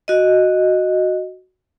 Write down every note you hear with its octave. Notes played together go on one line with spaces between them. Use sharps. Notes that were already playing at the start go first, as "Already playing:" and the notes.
F#4 D#5